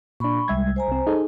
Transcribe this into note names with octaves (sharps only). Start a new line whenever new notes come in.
A#2 D4 B5 C#6
C2 G3 G#3 E5 G#6
C5 G#5 A#5
C2 C4
D#4 G#4 A4